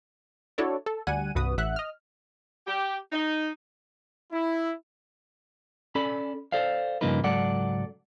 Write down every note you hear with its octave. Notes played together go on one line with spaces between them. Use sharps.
D4 E4 F#4 A4 C#5 D5
A4
D2 G3 F#5 G#5 D#7
C2 G2 F#4 B4 D#6
A1 E5 F#5 F#6
D#5 F6
G4
D#4
E4
C#4 A4 D5 B5
A4 C5 D5 F5
G2 C#3 F3 A#3 D#4 B4
C#2 G#2 F#3 A4 D5 F#5